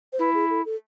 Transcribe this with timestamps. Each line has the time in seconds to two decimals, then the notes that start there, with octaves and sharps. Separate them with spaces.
0.13 C5
0.19 E4 B4
0.34 G#4
0.50 A4
0.65 A4